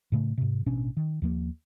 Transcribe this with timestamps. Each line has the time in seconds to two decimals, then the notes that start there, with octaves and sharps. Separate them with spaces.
0.12 A2 C#3 A3
0.38 G#2 C3
0.66 A1 B2 C#4 D4
0.97 D#3
1.22 D#2 F3 A#3